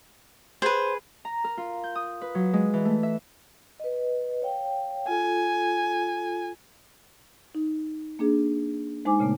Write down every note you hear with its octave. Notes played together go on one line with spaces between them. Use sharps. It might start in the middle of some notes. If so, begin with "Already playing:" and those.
G#4 B4 C5
A#5
A#4
F4
G6
D#6
B4
F#3
G#3
E3
A3
E5
B4 D#5
C#5 F5 G5
F4 A4 G#5
D#4
A#3 D4 G#4
G#3 D#4 C5 G#5 D6
A#2 C#3 A3 B3